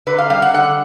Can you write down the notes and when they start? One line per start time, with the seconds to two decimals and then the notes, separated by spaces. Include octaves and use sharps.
0.07 D3 B4
0.18 F5
0.30 G3 F5
0.42 F#5
0.54 D3 F#5